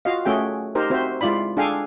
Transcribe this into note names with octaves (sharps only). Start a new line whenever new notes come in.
F4 F#4 D#5 F5
A3 C#4 F#4 G#4 E5 G5
D#4 G4 A#4 C5
C4 F#4 C5 E5
G#3 E4 F4 D5 B5
D4 G#4 A4 F5 G5 G#5